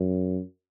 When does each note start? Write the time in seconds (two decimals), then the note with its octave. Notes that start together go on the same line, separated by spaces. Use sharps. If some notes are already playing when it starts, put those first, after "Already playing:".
Already playing: F#2